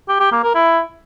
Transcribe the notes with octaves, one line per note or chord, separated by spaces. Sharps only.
G4
G4
A#3
A#4
E4